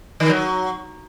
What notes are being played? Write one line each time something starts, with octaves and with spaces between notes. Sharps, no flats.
D#3
F#3